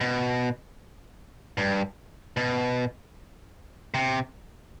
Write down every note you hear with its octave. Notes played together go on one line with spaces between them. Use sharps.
B2
G2
B2
C3